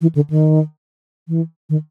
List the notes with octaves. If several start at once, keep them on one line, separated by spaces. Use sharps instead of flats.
E3
D3
D#3
E3
D#3